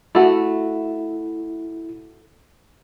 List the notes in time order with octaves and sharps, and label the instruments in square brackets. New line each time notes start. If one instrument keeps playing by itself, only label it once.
[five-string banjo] A3 F#4 [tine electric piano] E4